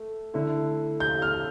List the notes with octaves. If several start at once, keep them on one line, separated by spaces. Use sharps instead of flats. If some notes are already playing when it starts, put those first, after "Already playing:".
Already playing: A3
D3 A3 E4
G6
F6